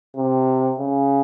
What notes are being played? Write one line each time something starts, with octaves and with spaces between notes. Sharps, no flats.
C3
C#3